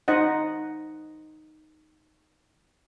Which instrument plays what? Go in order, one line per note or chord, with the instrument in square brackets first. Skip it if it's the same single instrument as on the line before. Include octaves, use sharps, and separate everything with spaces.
[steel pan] D#4 C5 D#5 F#5